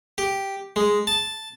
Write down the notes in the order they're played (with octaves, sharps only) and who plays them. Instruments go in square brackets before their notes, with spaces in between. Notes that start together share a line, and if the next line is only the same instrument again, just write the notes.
[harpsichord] G4
G#3
A5